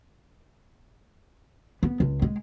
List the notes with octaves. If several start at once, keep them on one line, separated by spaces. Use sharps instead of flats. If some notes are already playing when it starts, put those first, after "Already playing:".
B3
C#2
G#3